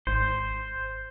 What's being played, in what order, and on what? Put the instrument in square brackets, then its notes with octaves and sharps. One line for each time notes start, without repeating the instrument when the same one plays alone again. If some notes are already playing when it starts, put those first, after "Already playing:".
[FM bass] G#1 [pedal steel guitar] C5